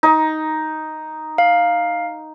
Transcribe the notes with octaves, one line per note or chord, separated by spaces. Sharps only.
D#4
F5